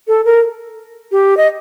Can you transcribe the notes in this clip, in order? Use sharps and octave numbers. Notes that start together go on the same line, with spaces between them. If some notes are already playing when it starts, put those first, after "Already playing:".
A4
A#4
G4
D#5